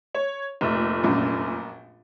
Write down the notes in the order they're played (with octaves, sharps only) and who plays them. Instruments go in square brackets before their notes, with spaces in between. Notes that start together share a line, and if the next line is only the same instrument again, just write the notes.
[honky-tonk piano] C#5
F1 A#2 A3
[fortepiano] A#1 F#2